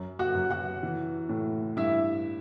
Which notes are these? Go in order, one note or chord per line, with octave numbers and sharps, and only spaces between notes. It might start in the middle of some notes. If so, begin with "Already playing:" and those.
Already playing: F#2
F#4 F#5
F#2
F#4 F#5
E3
A2
G2 E4 E5